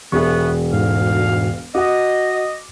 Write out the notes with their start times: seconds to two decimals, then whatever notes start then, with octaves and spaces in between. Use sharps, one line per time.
0.12 E1 C2 B3 G#4 E5 C#6
0.73 D2 G#2 F5
1.75 F#4 D#5 F#5 D6